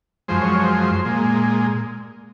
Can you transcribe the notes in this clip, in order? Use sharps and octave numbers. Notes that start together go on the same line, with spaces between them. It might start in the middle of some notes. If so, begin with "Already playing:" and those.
F#2 F3 G#3 C5
C#5
C5
A#2 G#3